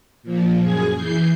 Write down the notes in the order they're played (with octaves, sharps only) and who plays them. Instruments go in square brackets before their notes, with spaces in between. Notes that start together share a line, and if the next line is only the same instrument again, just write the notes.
[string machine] A#2 F3
F#2 G#4 G#6
E3 G6 C7